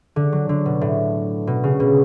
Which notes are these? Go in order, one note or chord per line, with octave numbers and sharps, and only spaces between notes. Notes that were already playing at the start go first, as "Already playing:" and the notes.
D3
F#3
D3
B2
A2
B2
C#3
B2